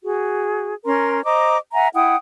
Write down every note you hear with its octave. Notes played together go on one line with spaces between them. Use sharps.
F#4 G#4
C#4 A#4 A#5 C6
C5 D#5 A#5 D6
E5 F#5 G#5 A#5
E4 F#5 G5 D#6